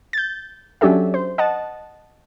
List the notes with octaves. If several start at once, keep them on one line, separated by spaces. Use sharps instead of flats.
G6 A6
F#3 C#4 D4 G4 A4 E5
C5
D#5 F#5 A5